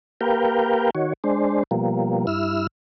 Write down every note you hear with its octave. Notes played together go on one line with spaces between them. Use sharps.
A#3 G4 A#4 B4 F5 G5
D#3 F#4 C#5
G#3 D4 C5
B2 F3 G3 A#3
G2 E4 E6 F6